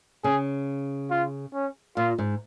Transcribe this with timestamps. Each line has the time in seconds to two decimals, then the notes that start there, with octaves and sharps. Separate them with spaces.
0.24 C#3 G#4
1.10 F4
1.54 C#4
1.96 A#2 F4
2.18 G#2